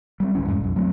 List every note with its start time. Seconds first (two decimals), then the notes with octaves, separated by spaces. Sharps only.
0.20 G3 A3 C4
0.35 G#1 C#2 E3 C#4
0.47 F2 G#2
0.61 B1 F#2
0.76 F#3 A3 B3 C4